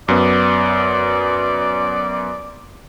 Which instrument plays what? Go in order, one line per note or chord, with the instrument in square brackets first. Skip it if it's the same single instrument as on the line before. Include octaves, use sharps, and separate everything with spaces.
[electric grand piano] F#2 B3 [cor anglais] D5